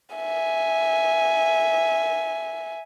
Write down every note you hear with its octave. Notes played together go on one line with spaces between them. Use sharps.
E5 G#5